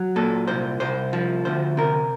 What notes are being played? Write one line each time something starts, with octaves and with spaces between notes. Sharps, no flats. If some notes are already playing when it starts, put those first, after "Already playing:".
Already playing: F#3
A#2 A4
C2 C5
C2 C5
F3
D2 C5
C3 A#4